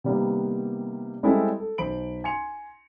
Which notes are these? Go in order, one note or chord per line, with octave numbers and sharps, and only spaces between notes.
C3 D#3 G3 A#3 B3
G3 G#3 C4 E4 G4 A4
A4
B1 C5 B5 D7 F#7
G#5 C6 C#7 F7